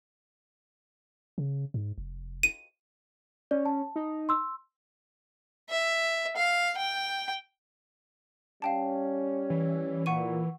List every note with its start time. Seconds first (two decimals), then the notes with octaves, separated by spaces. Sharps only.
1.38 C#3
1.74 G#2
1.98 F1
2.43 D#7
3.51 C#4 D5
3.66 A5
3.96 D#4
4.29 C6 E6
5.69 E5
6.37 F5
6.77 G5
8.62 G3 C#4 F5 G5 A5
9.50 E3
10.06 A#2 F#5 C#6 D#7